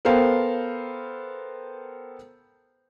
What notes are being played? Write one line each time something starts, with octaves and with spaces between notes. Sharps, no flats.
B3 A4 A#4 C5 F5 G5